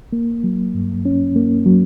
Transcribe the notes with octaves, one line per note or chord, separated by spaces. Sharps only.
A#3
F#3
G2
C#4
A#3
F#3